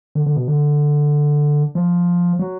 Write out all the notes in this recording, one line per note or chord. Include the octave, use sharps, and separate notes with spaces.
D3
D3
B2
D3
F3
F#3